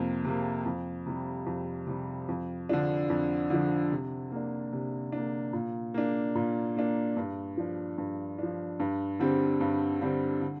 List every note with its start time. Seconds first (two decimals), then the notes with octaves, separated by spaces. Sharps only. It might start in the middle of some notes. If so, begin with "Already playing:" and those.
Already playing: F2 C3 A#3
0.25 C3 A#3
0.65 F2
1.06 C3 G3
1.46 F2
1.87 C3 G3
2.28 F2
2.69 D3 F3 D4
3.10 F2
3.50 D3 F3 D4
3.91 C3
4.32 A#3 D4
4.73 C3
5.12 A#3 D4
5.53 A#2
5.94 A#3 D4
6.35 A#2
6.77 A#3 D4
7.17 G2
7.57 F3 D4
7.98 G2
8.39 F3 D4
8.80 G2
9.20 D3 G3 C4
9.61 G2
10.02 D3 G3 C4
10.42 D3